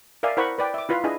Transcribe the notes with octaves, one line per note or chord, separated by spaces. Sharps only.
A#4 D5 E5 F5 G#5
E4 A#4 C5 F#5 B5 C#6
B4 D5 G5
E5 D6
E4 F4 B4 F5
D4 E4 G#4 B4 D#5 G#5